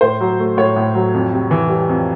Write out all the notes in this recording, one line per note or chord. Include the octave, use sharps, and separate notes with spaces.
A2 C5
F#3
A3
A2 C#5
A2
F#3
F2
C3
E3
G3
F2